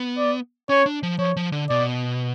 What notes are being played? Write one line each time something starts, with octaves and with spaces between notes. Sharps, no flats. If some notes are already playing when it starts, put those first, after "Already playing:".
Already playing: B3
D5
C#4 C#5
D4
F3
F3 C#5
F3
D3
B2 D5